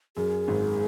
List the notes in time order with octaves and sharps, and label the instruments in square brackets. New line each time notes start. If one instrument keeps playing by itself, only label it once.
[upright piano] F#2 [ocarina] G#4
[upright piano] G#1 G#2